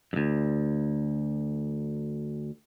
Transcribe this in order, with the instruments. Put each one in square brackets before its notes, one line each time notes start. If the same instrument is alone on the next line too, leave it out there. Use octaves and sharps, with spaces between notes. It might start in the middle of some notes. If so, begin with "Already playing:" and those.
[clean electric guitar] D2 G2